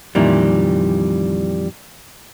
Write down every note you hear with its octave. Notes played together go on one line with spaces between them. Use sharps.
F2 A#2 D#3 E3 G3